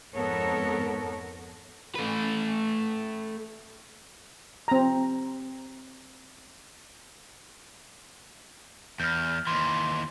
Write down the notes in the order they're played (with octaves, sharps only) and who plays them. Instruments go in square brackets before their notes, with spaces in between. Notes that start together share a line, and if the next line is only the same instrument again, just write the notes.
[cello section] F2 G#2 B3 A4 A#4 C#5
[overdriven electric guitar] A3 B4
[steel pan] C4 A#5
[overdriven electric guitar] E2 [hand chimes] F6 G6
[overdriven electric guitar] D#2 E3 [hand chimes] C6